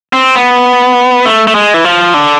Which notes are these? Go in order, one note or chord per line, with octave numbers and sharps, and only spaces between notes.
C4
B3
A3
A3
G#3
E3
F3
D3